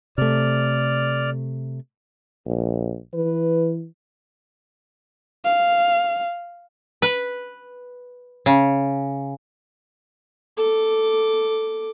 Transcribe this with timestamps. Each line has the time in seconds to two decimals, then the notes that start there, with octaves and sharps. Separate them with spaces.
0.18 C3 A3 D5 F6
2.46 A#1
3.14 E3 B4
5.44 F5
7.02 B4
8.46 C#3
10.57 A4 D6